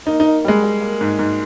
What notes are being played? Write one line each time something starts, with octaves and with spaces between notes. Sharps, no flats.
A#3 D#4
D#4
A#3
G3 G#3
G3
A#3
G#2
G#2